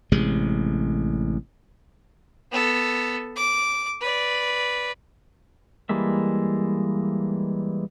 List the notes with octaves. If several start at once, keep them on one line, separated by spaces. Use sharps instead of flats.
A1 C3 G#3
B3 A4
D6
B4 D5
E3 G3 G#3 A#3 E5